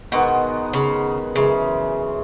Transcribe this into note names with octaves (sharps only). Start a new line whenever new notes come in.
B2 D#3 G#3 B3 F#4
C#3
F#2 C#3 E3 G#3